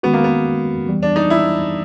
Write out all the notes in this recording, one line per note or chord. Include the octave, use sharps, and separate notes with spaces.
D#3 G#3 B3 C#4 F#4
A#3
B3
E3 G3 B3
D4
D#4
E4